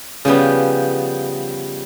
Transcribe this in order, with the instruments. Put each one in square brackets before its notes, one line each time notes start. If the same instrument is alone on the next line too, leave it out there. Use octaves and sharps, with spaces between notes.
[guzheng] C#3 F3 G3 B3